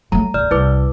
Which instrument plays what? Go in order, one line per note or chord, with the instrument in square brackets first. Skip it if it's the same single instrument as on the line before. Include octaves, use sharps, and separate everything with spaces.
[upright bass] F#3 A3 [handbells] A#5
[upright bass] D1 [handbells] D5 F6
[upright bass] C2 [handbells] E4 B4 D6